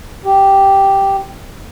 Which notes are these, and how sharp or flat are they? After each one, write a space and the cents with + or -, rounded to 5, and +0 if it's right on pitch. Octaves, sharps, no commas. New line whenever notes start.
G4 -5